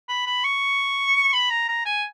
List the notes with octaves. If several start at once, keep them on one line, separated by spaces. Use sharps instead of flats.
B5
B5
C#6
B5
A#5
A#5
G#5